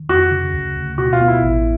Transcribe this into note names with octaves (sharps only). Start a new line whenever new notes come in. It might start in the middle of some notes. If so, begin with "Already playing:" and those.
Already playing: D#3
F2 F#4
C#3
D2
D2
B2 F#4
F4
B3
E4
A1